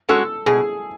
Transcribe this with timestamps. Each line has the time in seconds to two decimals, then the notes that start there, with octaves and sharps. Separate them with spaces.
0.09 G#3 C#4 F#4 A4
0.46 B2 G#4